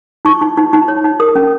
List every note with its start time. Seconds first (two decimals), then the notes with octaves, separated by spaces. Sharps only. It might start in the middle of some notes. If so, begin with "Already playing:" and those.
0.25 D#4 C#6
0.41 D#4
0.57 D#4
0.73 D#4
0.88 C#5
1.04 D#4
1.20 A#4 D#6
1.36 C#4